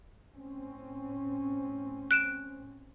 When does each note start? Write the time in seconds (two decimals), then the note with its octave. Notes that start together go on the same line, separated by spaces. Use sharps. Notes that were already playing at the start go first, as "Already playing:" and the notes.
0.33 A2 C4 C#4
2.11 F#6 D7 E7